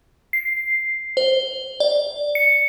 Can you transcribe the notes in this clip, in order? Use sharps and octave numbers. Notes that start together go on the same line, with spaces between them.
C7
C5
D5
C#7